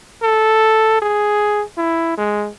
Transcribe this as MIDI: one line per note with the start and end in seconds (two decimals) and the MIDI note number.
0.22 0.99 69
1.02 1.62 68
1.77 2.16 64
2.17 2.48 56